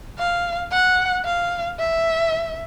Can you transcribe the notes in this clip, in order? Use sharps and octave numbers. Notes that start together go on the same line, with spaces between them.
F5
F#5
F5
E5